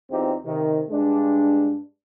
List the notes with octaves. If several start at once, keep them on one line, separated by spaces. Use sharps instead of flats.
E2 C4 D#4 F4 G4
C3 D#3
G2 G#3 D4